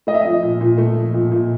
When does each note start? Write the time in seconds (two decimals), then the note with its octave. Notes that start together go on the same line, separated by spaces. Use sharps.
0.07 A3 D#5
0.14 E5
0.22 F3 D#5
0.43 A#2
0.61 A#2
0.78 A3
0.96 F3
1.14 A#2
1.31 A#2